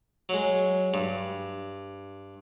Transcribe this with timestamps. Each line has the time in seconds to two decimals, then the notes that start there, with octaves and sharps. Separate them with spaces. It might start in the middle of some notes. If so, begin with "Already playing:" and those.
0.29 F#3 G#3
0.94 G2